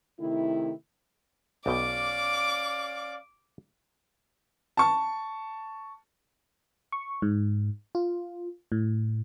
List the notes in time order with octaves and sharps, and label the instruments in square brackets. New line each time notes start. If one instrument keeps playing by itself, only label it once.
[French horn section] C3 D#3 A3 E4
[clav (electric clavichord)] B1 B2 G5 [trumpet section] C#4 D5 F5 [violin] D6
[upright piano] A5 C#6
[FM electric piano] C#6
G#2
F4
A2